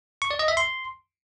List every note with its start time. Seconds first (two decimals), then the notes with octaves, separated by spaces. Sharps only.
0.22 C#6
0.31 D5
0.39 D#5
0.48 E5
0.57 C6